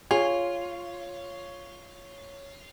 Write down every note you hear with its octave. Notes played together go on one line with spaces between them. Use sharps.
F4 G#4 C#5